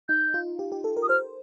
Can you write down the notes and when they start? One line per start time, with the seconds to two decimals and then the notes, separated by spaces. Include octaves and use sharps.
0.09 D#4 G6
0.34 F4
0.59 G4
0.72 G4
0.84 A4
0.97 A#4
1.03 D#6
1.09 C5 F6